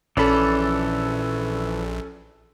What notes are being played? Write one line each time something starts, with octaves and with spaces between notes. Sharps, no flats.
A#1 E3 C#4 A4 D5 B5